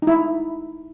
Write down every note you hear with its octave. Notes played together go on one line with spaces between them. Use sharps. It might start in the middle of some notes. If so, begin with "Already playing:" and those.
D#4
E4